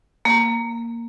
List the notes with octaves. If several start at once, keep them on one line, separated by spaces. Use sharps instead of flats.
A#3